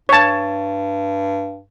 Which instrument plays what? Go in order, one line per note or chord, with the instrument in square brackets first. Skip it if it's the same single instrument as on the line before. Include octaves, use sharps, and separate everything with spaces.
[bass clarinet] G2 [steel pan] C#5 A5